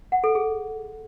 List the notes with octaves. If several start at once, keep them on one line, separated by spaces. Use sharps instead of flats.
F#5
A4
G#4